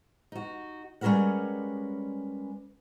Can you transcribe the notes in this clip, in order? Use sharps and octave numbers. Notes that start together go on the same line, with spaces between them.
D#4 F#4
G3 G#3 C#4 A#4 B4 F#5